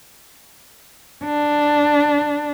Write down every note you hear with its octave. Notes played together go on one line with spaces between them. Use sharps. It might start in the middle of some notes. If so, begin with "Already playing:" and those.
D4